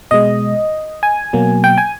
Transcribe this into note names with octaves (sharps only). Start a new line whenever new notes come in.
B2 G#3 D#5
G#5
B2 F#3 A#3
G5
G#5